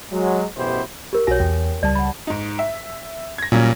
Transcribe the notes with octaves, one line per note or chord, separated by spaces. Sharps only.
F#3 G#3
A1 F#2 B2 E4 G4 C5
G4 A#4
B1 F#4 C#5 G#5 A#6
E2 G5
C#2 G3 D5 A5
F#5 B5
G#2 D#4
E5
G#6 A#6
A#2 F#3 G3 C#4